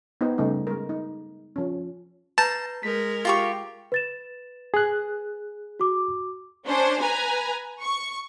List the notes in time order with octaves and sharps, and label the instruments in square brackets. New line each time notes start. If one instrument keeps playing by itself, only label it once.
[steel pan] B3 D#4 G4 C5
C#3 G3 A3 D#4
G#3 A#4
D#4
F3 C#4
[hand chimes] B4 G6 [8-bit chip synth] A5 [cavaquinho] A#5
[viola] G#3 A#4 [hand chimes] B6
[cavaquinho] F4 G4 C#6
[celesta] B4 A6 E7
[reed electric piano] G#4 F#6
[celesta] F#4 D6
[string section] C#4 D4 C5
B4 G#5 A#5
C#6